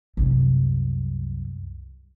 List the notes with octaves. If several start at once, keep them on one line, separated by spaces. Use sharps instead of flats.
C2 F#2